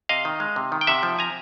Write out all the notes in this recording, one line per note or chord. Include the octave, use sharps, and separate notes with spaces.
C3 D#5 F5
D#3
G#3
C3
D#3
G5
C3 E5 F#5
F3
C3 G#5 A#5